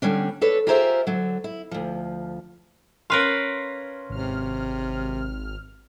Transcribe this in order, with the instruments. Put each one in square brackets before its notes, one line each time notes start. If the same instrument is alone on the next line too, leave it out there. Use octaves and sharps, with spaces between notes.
[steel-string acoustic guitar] D3 G3 C#4 D4
D4 A4 B4 C#5
F4 G4 G#4 A#4 C5 E5
D3 F#3
E4
D2 F3
[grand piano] C#4 C6 [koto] A#4 B4 F5
[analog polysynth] G#1 F6 [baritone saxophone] C3